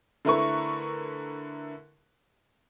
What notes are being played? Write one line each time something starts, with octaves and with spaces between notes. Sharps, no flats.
D3 A3 E4 A#4 B4 C#6